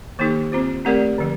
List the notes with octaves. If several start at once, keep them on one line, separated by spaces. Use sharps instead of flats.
D#3 A#3 D#4 G4
C4 F4 C5
A3 C4 G4 A#4 D5
D3 F3